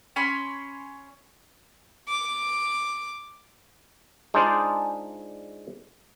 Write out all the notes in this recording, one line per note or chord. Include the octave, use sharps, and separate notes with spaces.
C#4 C#5 B5 C6
D6
G#3 D4 D#4 F4 C5 D5